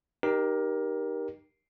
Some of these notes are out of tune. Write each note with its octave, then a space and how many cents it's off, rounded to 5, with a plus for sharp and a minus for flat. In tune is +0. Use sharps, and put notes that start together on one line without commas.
D#4 -20 G4 +0 A#4 +20